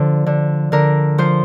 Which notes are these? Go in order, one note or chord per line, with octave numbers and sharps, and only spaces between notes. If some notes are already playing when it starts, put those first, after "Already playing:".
Already playing: D3 F3 C5
D3
D3 A#4
F3 C5